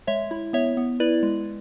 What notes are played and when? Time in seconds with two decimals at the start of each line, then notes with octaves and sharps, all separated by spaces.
0.07 G#3 C#5 E5
0.31 E4
0.53 B3 C#5 E5
0.77 B3
1.00 E4 B4 D5
1.23 G#3